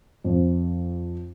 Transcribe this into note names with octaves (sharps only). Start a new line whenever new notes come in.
F2